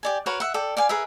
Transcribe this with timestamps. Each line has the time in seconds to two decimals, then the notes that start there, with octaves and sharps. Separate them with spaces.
0.03 G4 D5 G#5
0.26 F#4 A#4 B4 C#5
0.40 E5 F#5
0.54 A4 D5 G5
0.77 D5 F5 G#5
0.89 G#4 A#4 B4 E5